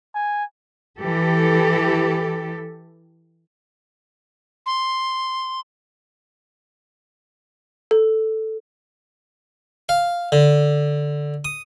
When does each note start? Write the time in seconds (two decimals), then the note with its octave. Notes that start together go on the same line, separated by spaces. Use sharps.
0.15 G#5
1.00 E3 G4 A4
4.66 C6
7.91 A4
9.89 F5
10.32 D3
11.45 D#6